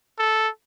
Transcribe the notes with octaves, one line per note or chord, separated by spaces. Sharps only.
A4